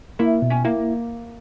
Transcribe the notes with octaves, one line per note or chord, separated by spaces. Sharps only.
A#3 E4
B2
C#4
A#3 E4